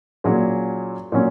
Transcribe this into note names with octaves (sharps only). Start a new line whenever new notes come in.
A#2 F#3 C#4 G#4
A#2 F#3 C#4